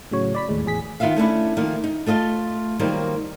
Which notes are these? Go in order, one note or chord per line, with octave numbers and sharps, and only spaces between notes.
A2 C#3 F#3 C#5
D5 B5 B6
D#2 A2 G#3
E2 A2 G#4 B6
D#3 B3 F4 E5 F5
A3 C#4 D4 E4
D#3 F3 A3 A#3
D#4
A3 F4 D#5 F5 A5
D#3 F#3 G3 A#3 C5